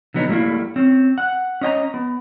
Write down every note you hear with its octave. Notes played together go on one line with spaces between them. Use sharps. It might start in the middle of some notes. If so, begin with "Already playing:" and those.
D3 F#3 B3 D#4
F#3 G3 A3 A#3 E4
C4 C#4
F#5
C#4 D#5 G5 A#5
B3